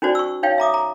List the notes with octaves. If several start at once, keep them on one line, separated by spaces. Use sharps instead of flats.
C#4 D#4 F#4 C5 D5
C#6 E6
D#4 C#5 F5 G5
E5 A#5 D6 D#6
A#5